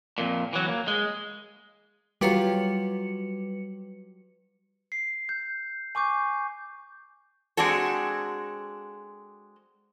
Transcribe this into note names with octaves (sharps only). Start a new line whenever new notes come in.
F2 A#2
E3 F#3
A#3
G#3
F#3 G3 F4 G4 B4 C#7
C7
G6
G#5 C#6 D6 G6
G#3 C4 D4 F#4 A4